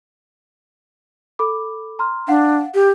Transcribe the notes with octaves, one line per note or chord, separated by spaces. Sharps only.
A4 B5 D6
A#5 C6 F6
D4 F5 F#5
G4